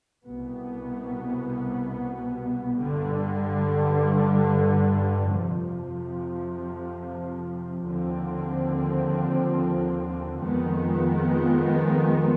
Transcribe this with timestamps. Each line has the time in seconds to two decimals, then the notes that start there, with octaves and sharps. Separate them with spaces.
0.24 C2 B2 B3
2.78 G2 D3 G3
5.32 F2 C3 F3
7.85 D#2 D3 F3 C4
10.38 F2 D#3 G#3 B3